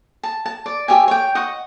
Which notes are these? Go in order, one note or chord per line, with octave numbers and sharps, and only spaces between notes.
A5
A5
D5
G4 C#5 E5 G#5
C#5 G5
D#5 F#5 C#6